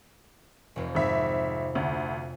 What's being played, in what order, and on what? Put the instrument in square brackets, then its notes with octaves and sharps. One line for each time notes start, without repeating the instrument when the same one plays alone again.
[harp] F1 F2
[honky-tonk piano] G#1 E5
D2